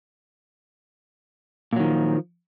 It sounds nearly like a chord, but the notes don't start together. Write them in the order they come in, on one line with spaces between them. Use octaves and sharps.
A#2 F#3 D#3 F3